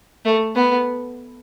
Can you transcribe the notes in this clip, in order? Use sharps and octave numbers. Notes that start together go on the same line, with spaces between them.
A3
B3